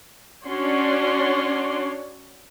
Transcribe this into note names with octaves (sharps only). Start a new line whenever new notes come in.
C#4 D4 F#4 C#5 D5 C6